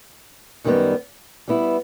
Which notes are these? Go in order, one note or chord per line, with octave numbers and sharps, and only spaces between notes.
F#2 D#3 G3 B3
G3 B3 E4